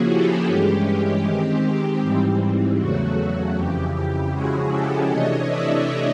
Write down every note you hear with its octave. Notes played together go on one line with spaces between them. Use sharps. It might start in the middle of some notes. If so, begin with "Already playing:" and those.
Already playing: C#3 F3 A#3 C#4 E4 F#4 G#4
G4 A4
G2 E3 G#3 C#4 G4
D#3 G#3 C4
G#2 E3 G3 C4
E2 C#3 F#3 A3 F#4
F2 C#3 E3 G4
G4
C#3 F3 G#3 C#4 E4 F#4 G#4
G4 A4
C3 E3 A3 D4 C#5 D#5
D5 E5